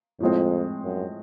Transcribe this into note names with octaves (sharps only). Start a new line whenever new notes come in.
F2 A2 F3 G#3 C4
F#2